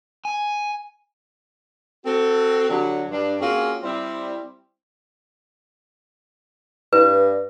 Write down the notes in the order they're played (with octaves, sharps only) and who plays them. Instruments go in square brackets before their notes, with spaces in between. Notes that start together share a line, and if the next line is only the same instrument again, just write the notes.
[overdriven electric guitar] G#5
[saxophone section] C4 F#4 A4
D3 F#3 G3
G2 D4
A#3 C4 C#4 F4 F#4 G#4
G3 C4 E4
[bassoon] G2 [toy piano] B4